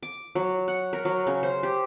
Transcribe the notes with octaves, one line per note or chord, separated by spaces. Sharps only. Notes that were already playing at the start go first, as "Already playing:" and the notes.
D6
F#3
F#5
A#4
F#3
C#3
C5
G4